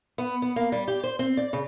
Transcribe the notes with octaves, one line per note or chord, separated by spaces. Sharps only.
B3
B3
A#3
G3
G4
C5
C4
D5
C#3